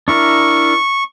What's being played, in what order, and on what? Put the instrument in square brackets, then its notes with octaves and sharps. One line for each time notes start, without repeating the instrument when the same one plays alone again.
[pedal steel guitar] D4 E4 A#4 [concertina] C#6